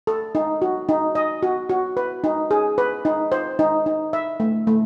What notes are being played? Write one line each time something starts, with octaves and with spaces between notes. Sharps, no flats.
A4
D#4
F#4
D#4
D#5
F#4
F#4
B4
D#4
G#4
B4
D#4
C5
D#4
D#4
E5
A3
A3